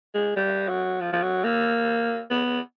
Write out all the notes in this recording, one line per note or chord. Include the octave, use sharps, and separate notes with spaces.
G#3
G3
F#3
F3
F3
F#3
A#3
B3